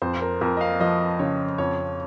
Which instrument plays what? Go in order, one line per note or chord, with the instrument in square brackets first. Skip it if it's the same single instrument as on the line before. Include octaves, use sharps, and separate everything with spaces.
[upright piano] F2 [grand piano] C5
[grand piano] A#4
[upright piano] F2 [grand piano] A#4
[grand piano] D#5
F5
[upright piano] F3 [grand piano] D#5
[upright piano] C#3 [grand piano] C#5
[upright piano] F2 [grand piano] C#5